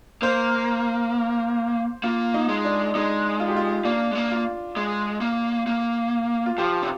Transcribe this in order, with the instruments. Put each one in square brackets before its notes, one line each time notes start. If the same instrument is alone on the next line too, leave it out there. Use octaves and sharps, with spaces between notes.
[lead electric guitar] A#3 [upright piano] C5
[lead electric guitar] A#3 [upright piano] F4
[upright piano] D#4
[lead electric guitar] G#3
[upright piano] D4
[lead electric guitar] G#3 [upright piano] D#4
[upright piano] F4
G4
F4
[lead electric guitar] A#3 [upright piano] D4
[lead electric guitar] G#3
A#3
[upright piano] F4
[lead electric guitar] G#3
A#3
A#3
[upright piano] F4
[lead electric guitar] F3 [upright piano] G4
[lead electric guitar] C3